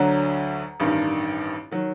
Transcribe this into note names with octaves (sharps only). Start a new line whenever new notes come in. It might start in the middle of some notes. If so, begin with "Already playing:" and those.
Already playing: D2 D3 F#3 A#5
A1 G2 D#3
D#3 F#3